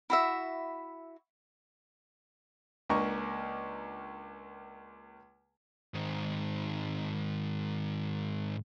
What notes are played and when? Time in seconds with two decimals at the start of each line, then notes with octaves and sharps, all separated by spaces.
0.10 E4 F#4 E5
2.89 C#2 A#3 D4 D#5 A#5 C#6
5.94 G#2 D#3